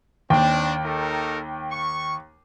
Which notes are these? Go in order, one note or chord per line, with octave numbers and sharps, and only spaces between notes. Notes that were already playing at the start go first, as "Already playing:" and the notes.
D#2 C4 D4 G5
D#4 A4 A#4
C#6